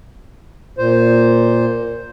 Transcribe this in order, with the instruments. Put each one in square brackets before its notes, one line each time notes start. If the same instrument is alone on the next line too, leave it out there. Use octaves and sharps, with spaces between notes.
[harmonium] A#2 C5